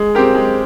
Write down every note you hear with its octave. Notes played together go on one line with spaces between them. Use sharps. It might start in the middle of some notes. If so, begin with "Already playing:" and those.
Already playing: G#3 G#4
C4 G4 A#4
G#3